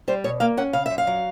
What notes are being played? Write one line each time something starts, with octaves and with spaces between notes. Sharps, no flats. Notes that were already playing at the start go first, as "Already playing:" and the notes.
G3 C5
B2 C#5
A#3 F5
C#4 F#5
C#3 F5
F#2 E5
F5
F#3